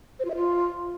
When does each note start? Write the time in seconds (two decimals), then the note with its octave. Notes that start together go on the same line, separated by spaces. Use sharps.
0.19 C5
0.25 F4
0.30 E5
0.36 F4